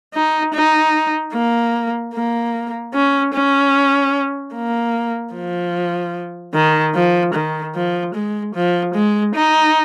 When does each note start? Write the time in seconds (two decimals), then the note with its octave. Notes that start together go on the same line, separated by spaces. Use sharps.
0.14 D#4
0.54 D#4
1.33 A#3
2.14 A#3
2.94 C#4
3.34 C#4
4.54 A#3
5.34 F3
6.54 D#3
6.95 F3
7.34 D#3
7.75 F3
8.15 G#3
8.55 F3
8.95 G#3
9.35 D#4